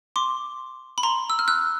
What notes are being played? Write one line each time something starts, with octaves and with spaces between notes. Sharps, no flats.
C6 D6
B5
A#5 C6
E6
F6
E6 F#6